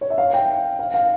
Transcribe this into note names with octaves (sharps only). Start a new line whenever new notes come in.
C#5
E5
F5
G5
F5
F5